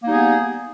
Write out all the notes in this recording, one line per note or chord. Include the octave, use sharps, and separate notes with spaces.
G3 A#3 B3 D#4 G#4